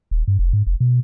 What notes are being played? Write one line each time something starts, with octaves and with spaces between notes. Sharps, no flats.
D#1
G2
F1
G#2
F1
B2